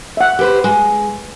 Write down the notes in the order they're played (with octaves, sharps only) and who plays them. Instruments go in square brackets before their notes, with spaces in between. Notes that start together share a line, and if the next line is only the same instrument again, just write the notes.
[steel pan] E5 F#5
[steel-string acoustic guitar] G4 B4 C5
G#3